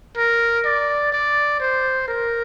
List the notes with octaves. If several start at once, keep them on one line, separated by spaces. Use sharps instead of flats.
A#4
D5
D5
C5
A#4